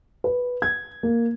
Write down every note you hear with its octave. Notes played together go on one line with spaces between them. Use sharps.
B4
G#6
A#3